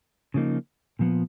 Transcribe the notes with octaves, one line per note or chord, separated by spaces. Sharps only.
C#3 F3 A#3 D#4
A#2 F3 B3